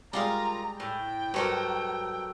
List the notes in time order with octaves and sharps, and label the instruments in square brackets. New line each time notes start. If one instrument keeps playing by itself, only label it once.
[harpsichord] G3 G#3 [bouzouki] D4 F4 A#4 [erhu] A#5
[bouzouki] A2 [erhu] G5
[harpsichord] G2 C5 [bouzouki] F#3 A4 A#4